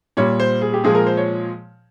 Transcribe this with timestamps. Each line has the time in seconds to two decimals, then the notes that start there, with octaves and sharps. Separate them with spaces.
0.17 A#2 G3 C#5
0.40 C5
0.61 G#4
0.74 G4
0.84 A#2 F3 G#3 G#4
0.95 A#4
1.07 C5
1.17 C#5